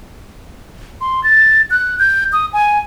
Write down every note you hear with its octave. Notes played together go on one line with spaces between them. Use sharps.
C6
A6
F#6
G6
D#6
G#5